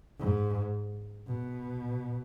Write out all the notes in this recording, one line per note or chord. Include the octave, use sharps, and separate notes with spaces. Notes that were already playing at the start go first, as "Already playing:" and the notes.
G#2
B2